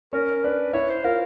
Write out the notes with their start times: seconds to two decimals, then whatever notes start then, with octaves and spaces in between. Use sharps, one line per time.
0.13 C#4 A#4 C#5
0.44 D4 B4 D5
0.73 E4 C#5 E5
0.89 C5
1.04 F4 A#4 F5